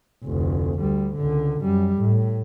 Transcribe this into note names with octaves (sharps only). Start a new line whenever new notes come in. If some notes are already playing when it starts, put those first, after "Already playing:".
F1 D2
D2 G3
C#2 D3
F#2 G3
A2